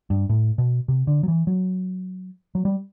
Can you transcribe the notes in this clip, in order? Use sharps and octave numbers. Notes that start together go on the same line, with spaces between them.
G2
A2
B2
C3
D3
F#3
E3
F#3
F#3
G3